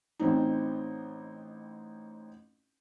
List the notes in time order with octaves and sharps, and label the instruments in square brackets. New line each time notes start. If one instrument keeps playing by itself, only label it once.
[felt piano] A1 C4 D#4